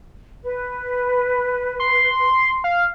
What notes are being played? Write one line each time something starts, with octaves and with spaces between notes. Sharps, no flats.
B4
C6
F5